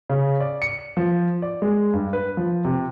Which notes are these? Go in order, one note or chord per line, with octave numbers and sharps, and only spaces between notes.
C#3
D5
C#7
F3
D5
G#3
G2
B4
F3
C3